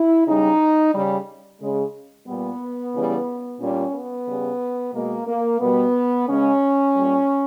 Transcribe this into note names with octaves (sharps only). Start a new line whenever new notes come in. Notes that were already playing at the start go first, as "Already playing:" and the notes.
Already playing: E4
C#3 G3 D#4
C#3 G3
C#3 G#3
A#2 G3 B3
C#3 E3 G3
A#2 G3 C#4
B3
C#3 G3
B2 G#3 A#3
A#3
B2 G3 B3
C#3 G#3 C#4
A#2 G3